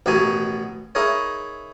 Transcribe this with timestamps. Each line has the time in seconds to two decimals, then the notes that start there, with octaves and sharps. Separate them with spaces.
0.06 A1 B2 D#3 D#4 F#4 G#5
0.95 D#4 E4 G#4 A#4 C#5